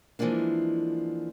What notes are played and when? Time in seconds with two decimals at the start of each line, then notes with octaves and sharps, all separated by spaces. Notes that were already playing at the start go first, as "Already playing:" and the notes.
0.19 E3 F3 G#3 A#3 D4